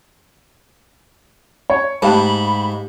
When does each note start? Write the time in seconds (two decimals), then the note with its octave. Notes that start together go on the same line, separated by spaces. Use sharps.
1.70 C#5
2.02 G#2 A3 G4 F5 A5 B5